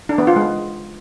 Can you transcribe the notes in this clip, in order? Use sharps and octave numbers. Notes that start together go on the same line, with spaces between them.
D4
B3
F4
G#3